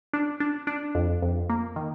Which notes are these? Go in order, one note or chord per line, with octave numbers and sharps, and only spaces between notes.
D4
D4
D4
F2
F2
A#3
D#3